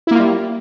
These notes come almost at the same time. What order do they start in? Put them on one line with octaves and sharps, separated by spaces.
E4 A#3 F4 G3